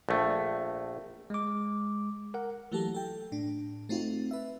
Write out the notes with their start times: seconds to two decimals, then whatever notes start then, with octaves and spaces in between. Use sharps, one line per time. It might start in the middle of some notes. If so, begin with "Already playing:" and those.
0.09 A#1 A3
1.30 G#3 D6
2.34 A#4 F#5
2.72 E3 F#3 A3 A#3 G4 A4
2.95 A4 G5
3.32 A2 D4
3.89 A3 C4 D#4 F4 F#4
4.31 B4 E5